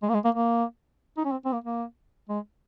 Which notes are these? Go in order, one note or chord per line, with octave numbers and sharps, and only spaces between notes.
G#3
A#3
G#3
A#3
A#3
D#4
C#4
C4
C4
A#3
A#3
G#3